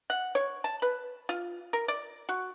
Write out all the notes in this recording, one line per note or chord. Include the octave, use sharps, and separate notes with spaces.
F#5
C#5
A5
B4
F4
A#4
D5
F#4